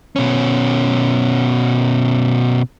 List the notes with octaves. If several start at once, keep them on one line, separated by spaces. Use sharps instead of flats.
B2 C#4